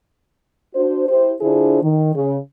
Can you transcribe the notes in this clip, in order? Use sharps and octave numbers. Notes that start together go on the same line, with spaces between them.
D4 F#4 C5
E4 G4 C5
D3 D4 E4 F4 G#4 C5
D#3
C#3